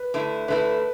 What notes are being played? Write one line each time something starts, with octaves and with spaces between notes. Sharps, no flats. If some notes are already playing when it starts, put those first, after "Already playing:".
Already playing: B4
D3 A3 E4
D3 A3 E4 B4